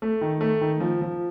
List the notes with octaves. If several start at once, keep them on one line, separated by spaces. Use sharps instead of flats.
A3
D#3
A3
D#3
F3
F3